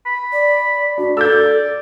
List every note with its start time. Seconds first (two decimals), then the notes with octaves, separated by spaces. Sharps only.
0.06 B5
0.33 D5
0.98 D4 F#4
1.17 A4 D5 E6 G6